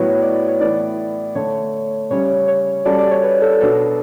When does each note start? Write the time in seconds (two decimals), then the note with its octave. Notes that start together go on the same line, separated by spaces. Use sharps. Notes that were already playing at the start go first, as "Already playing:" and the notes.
Already playing: A2 F#3 B3 C#5
0.22 D5
0.35 D5
0.48 C#5
0.60 A2 E3 B3 D5
1.35 D3 A3 D4 C#5
2.10 C#3 G3 C#4 C#5
2.48 C#5
2.85 G3 C#4 F#4 A4 D5
2.99 D5
3.11 C#5
3.23 B4
3.42 A4
3.60 B2 F#3 B3 D4 A4